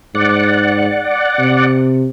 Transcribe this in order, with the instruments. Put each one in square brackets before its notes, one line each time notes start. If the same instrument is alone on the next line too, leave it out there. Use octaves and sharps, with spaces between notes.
[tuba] G#2 [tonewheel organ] D5 F#5
[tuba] C3